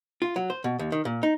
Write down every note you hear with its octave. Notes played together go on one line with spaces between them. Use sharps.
F4
F#3
C5
B2
D#2
D#3
A#2
D#4